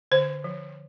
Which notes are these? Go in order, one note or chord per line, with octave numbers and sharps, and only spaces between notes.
D3 C5
F3